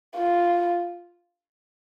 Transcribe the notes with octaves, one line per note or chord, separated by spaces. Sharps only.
F4